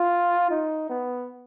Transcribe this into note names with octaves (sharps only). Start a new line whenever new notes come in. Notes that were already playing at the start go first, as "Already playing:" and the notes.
Already playing: F4
D#4
B3